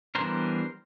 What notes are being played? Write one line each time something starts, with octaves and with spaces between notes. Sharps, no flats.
E3 G3 B3 D4 A#4 C5